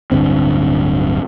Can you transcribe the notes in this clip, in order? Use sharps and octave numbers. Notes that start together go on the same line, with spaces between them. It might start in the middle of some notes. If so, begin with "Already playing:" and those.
D1 G2 D3 C4